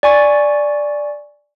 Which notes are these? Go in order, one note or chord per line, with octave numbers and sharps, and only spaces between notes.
D5 G#5 C#6 A6